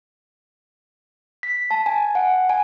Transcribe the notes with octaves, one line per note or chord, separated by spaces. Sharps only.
B6
A5
G#5
F#5
G#5